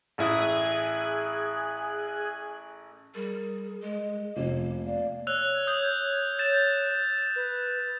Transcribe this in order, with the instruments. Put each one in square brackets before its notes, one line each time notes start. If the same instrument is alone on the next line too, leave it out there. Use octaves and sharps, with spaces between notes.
[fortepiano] A1 E4 D#6 [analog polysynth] G#4 G#5 F#6
[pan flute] G3 [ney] G#4 [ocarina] A#4
[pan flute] G#3 [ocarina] D#5
[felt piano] F1 [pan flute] A#3
[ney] D5 [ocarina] F5
[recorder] C#5 [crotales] E6 F#6 F7
[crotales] D#6 G6
G6 A6 E7
[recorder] B4